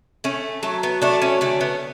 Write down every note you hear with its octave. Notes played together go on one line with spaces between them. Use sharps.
A3 C#4
F#3 A3
B3
A3 D4
C#4
D3 A3
B3